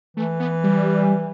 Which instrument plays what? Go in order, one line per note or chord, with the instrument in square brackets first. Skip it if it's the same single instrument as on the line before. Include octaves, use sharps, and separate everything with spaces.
[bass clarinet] E3 [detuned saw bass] A3
[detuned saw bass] B3
G3